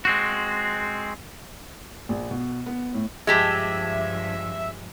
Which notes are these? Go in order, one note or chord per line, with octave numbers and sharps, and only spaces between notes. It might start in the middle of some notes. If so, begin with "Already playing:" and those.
G#3 C4 F#4
A#1
B2
B3
A2
G2 F3 G#3 G4 E5 A5 G#6 B6